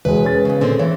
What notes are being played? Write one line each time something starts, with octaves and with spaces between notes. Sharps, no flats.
E1 G#3 B4 G#5
C#4 G#4 A6
E2 C#3
A#2 D3 C4
E3 C#5